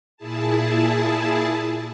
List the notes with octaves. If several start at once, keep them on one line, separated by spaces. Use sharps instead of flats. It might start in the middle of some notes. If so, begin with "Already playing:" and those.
A#2 E4 G#4 A5